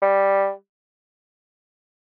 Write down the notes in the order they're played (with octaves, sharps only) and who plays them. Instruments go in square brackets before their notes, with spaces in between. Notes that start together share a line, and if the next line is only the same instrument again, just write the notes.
[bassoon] G3